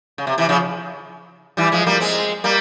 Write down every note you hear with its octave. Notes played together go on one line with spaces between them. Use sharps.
C#3
C3
C3 E3
C#3 F3
E3 G3
F3 G#3
G3 A#3
G#3 C4
G3 A#3